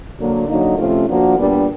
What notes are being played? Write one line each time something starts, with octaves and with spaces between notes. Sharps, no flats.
D3 F#3 A#3
D3 F#3 A#3 D#4
C3 F3 A3 C#4 F4
F3 A#3 D4 F#4 A#4
A#2 G3 B3 D4 G4